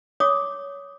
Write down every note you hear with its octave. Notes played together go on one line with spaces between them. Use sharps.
C#5 D6 D#6